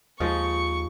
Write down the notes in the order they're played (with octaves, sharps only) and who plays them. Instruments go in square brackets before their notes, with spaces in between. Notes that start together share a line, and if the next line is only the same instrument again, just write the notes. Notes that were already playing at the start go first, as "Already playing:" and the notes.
[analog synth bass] D#2 [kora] F3 G#3 D#4 [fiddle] C#6